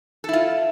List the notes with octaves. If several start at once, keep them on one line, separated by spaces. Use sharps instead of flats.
E4 F4 A4